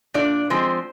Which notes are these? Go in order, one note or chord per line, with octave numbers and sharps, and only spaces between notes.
A#2 D4 D5
F3 G#3 C4 C5